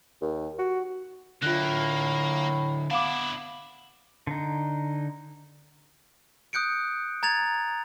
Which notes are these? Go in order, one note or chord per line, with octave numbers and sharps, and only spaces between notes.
D#2
F#4
A2 D3 A#3 E4 F4 F#6
B3 D4 E4 F5 D6
D3 D#4
D#6 F#6 G6 C#7 D7
A#5 G#6 A6 F7